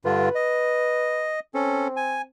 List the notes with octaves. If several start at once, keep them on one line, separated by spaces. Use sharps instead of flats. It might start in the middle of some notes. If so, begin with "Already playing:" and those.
G2 D3 F4 B4
D#5
C4 C#4 A4
G#5